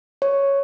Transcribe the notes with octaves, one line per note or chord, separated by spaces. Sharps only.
C#5